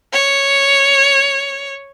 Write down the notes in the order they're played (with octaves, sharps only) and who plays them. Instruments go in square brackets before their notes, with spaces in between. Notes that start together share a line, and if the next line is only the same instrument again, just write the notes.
[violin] C#5